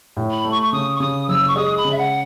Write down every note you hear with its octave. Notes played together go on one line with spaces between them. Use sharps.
A2
B5
A3
C#6
C#6
C#3 D#6
C#6
C#3 D#6
F#1 E6
C#6
G#3 D#6
B5
C#3
E5
F#5